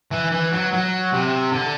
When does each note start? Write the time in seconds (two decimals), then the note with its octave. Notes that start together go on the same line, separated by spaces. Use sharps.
0.11 E3
0.32 E3
0.52 F#3
0.72 F#3
1.13 C3
1.52 D3